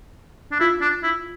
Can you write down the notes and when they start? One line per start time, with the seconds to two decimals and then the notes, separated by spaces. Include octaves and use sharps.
0.52 D4
0.60 E4 F4
0.81 D4
1.03 E4